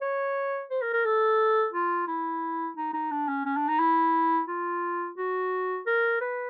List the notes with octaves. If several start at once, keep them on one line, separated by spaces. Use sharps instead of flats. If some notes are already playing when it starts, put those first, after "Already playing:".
C#5
C5
A#4
A#4
A4
F4
E4
D#4
D#4
D4
C#4
C#4
D4
D#4
E4
F4
F#4
A#4
B4